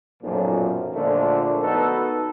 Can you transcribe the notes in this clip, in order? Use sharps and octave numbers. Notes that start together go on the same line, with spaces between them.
B1 F#2 A#2 F3
A#2 D3 F3 G#3 A3
B3 D#4 F#4 A4 B4